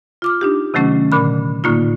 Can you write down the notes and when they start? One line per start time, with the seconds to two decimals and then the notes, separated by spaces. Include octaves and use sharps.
0.22 F4 D6 F6
0.41 D4 D#4 G4
0.74 C3 D#3 F#3 A3 C#4
1.12 A#2 D3 B5
1.64 A2 D3 A#3 D#4 F4